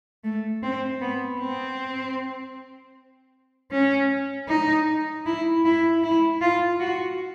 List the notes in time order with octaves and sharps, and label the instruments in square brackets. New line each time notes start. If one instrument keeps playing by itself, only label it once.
[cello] A3
C4
B3
C4
C#4
D#4
E4
E4
E4
F4
F#4